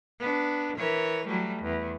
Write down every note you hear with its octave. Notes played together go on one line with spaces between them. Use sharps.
B3 D4
E3 A#4 C#5
F#3 G3 A3
E2